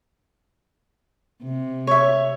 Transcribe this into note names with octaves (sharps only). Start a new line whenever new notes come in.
C3
C#5 E5